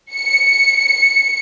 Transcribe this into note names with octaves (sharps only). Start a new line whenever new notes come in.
C#7